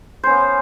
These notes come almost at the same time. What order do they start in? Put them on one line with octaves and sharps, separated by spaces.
C5 C#4 B3